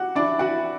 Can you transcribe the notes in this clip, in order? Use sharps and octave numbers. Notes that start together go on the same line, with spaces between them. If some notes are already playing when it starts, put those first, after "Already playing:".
Already playing: F#4 G4 F#5
D4 E4 D5
F#4 B4 F#5